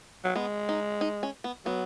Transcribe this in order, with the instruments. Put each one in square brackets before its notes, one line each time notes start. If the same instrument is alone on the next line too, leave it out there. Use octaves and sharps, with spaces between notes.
[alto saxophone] F#3
[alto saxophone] G#3 [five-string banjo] B3
[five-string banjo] D#4
D#4
C#4
B3
[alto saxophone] F#3 [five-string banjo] B3